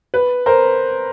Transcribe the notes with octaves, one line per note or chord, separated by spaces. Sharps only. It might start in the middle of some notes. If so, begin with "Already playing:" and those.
B4
A#4 C5